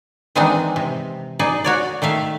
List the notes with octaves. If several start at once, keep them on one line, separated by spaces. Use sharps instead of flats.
D#3 E3 G#3 C4 D4 D#4
C3
D#4 G#4 D5
F#4 C#5 D5
D#3 A3 E5 F5